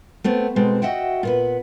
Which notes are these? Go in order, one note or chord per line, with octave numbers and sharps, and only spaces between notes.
A3 B3 C4
B2 G#3 C4 A4
F#4 D#5 E5 F#5 G5
A#2 B3 B4